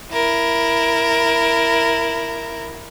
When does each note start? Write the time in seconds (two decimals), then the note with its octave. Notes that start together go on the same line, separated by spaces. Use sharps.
0.12 E4 A#4